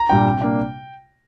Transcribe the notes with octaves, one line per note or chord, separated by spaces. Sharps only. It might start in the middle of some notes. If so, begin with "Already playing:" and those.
Already playing: A#5
A#2 G3 D4 G5
C3
A#3 D4